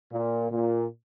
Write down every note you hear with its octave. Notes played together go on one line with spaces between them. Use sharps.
A#2
A#2